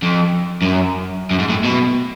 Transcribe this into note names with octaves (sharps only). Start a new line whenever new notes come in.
F2
F#2
F#2
G#2
A2
B2